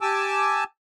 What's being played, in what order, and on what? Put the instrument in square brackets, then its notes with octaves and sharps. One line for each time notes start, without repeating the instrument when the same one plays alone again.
[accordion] G4 G#5 A5 D6 E6